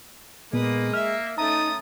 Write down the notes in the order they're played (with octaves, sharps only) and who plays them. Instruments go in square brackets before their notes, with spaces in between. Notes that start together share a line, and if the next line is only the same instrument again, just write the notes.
[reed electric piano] A#2 B3 [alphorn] G#3 [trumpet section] A#3 [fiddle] B4 D#6
[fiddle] E5 [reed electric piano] F6
[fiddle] A3 C#4 [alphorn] D#4 [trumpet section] A5 D#6 [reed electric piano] A#5